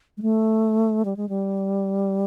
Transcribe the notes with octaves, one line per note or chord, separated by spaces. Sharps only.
G#3
A3
G3
G#3
G3